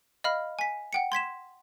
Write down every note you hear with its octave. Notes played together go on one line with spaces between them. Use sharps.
D#5 F5 B5 F6
G#5 B6
F#5 G5 C#7
C6 G#6 B6 E7